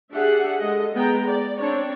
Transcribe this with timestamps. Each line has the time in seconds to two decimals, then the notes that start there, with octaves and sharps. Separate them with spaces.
0.12 D4 G4 G#4 E5 F#5
0.60 G#3 A4 D#5
0.94 G#3 B3 G5 A#5
1.27 D5
1.60 C4 D4 C#5